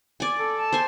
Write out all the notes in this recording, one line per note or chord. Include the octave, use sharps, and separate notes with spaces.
D5 G#5
A4
A5
C5 G#5